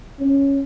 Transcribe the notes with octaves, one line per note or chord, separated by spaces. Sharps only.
C#4